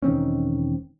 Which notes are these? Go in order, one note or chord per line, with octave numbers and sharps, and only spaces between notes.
E1 D#3 C4 C#4